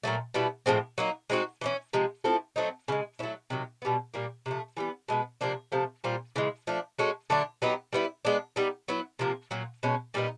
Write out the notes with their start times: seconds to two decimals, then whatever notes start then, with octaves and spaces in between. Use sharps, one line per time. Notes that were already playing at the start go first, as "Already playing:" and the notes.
0.03 A#2 F#3 A3
0.34 B2 G3 B3 E4
0.66 A2 F3 G#3 C4
0.98 F#3 A#3 D#4
1.30 G#3 C4 D#4 F#4
1.61 E3 A3 C#4
1.93 C3 F3 G#3
2.24 F3 A3 C4 E4
2.56 F#3 A3 C4 D#4
2.88 C#3 E3
2.92 G#3
3.19 F#3 A3 C#4 E4
3.50 C3 D#3 F#3
3.82 B2 G3 B3
4.14 A#2 G3 A#3
4.46 C3 F3 A3
4.77 E3 G3 B3
5.08 B2 G#3 B3
5.41 C3 F3 A#3 D4
5.72 C3 F3 A3
6.04 A#2 G3 C4 F4
6.36 C#3 E3 G#3
6.67 F3 A3 D4
6.98 G#3 C#4 F#4 A4
7.30 D3 F#3 A3 D4
7.62 F#3 B3 D#4 G4
7.93 G3 B3 E4
8.25 G#3 B3 D4
8.56 G3 B3 D#4
8.88 F#3 B3 E4
9.19 C3 F3 A#3
9.51 A#2 F#3 A#3
9.83 B2 G#3 C#4
10.14 A#2 G3 B3 D#4